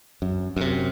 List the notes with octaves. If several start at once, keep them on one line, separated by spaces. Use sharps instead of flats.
F#2
F#2 C3